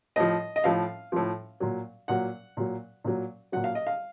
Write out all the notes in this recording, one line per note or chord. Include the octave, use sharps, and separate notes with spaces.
A2 F3 D#5
D#5
A2 F3 F5
A2 F3
A#2 F#3
A#2 F#3 F#5
A#2 F#3
A#2 F#3
A#2 F#3 F#5
F5
D#5
F5